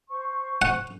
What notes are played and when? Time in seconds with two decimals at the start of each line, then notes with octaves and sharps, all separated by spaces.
0.09 C5 C#6
0.62 F#5